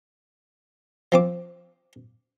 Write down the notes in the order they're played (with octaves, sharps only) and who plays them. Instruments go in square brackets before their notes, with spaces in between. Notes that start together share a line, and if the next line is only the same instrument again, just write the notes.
[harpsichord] F3 C4 D6